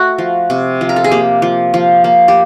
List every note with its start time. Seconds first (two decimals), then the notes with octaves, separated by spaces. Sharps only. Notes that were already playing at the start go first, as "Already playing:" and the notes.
Already playing: A3 F#4
0.18 F3
0.50 C3
0.81 F3
0.89 A#4
0.96 A4
1.04 G#4
1.11 A#3 G4
1.42 F3
1.74 F3
2.04 A#3
2.28 G4